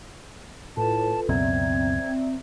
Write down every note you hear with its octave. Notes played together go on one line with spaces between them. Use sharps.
A2 F4 A4 B4 A5
C#2 F#2 B2 C4 D5 E5 A#5 G#6